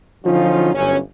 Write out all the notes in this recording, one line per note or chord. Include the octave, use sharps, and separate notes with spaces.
D3 F3 F#3 C#4 D#4 F4
G1 F#2 C#4